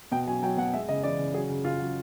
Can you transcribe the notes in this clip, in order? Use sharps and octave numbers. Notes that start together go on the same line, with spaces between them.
B2 G5
F#3 G#5
F#3 G5
B2 F#5
G#3 E5
C#3 D#5
E3 D5
C#3
F#3 G#4
C#3
C#3 F4
F#3